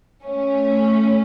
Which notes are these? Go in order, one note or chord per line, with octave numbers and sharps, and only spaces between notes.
A3 C#4